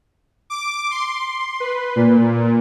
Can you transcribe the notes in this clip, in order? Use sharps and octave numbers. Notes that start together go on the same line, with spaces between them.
D6
C6
B4
A#2